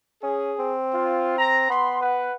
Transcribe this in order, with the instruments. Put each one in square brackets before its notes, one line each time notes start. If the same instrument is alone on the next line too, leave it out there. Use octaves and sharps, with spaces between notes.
[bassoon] C#4 [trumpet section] G#4
[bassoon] C4
[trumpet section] F4
A#5
[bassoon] B3 [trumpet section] B5 C6
[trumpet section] B4 F#5